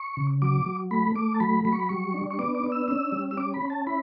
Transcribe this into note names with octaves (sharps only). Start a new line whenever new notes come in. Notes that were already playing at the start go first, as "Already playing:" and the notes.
Already playing: C#6
C#3
F#3 D6
F#3
A3 B5
A3 D6
A5
F#3 B5
F#3 B5
C#6
B5
G3 C#6
D4
C#6
B3 D6
D6
D4
E6
C#4 E6
G3
E6
C#4 D6
B5
C#4
A5
E4 B5